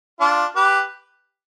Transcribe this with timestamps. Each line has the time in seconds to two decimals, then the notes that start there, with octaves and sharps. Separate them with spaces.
0.20 D4 F4
0.56 G4 B4